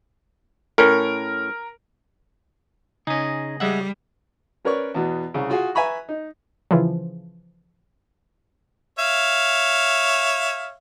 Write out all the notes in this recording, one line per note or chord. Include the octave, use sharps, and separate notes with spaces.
A2 C#4 A#4
C#3 C#4 D#4 G#4 D#5
G3 G#3 E5 F#5
C#4 A#4 B4 C#5 D5 C#6
E2 B2
C2 C#3
F4 F#4 G#4
B4 E5 G#5 A#5 B5 C#6
D#4
C#3 E3 F3
C#5 E5 F5